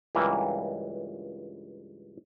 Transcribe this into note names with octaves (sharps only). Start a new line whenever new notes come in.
C#2 G2 E3 A#3